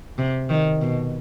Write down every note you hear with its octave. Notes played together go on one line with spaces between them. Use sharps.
C3
D#3
B2